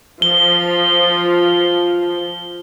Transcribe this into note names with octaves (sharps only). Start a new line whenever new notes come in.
F3 G7